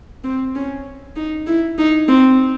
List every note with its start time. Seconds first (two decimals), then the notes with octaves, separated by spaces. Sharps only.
0.24 C4
0.55 C#4
1.16 D#4
1.47 E4
1.78 D#4
2.08 C4